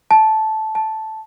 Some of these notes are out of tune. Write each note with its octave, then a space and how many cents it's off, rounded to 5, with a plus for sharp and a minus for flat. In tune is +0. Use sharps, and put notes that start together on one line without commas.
A5 -10
A5 -5